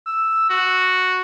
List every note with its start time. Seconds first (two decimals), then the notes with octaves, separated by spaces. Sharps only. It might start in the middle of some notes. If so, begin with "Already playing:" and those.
0.06 E6
0.50 F#4